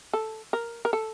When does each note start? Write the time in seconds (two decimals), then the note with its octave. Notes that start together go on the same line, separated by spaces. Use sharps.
0.13 A4
0.53 A#4
0.85 A#4
0.93 A4